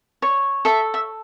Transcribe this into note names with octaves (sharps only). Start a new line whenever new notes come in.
C#5
A4 E5
E5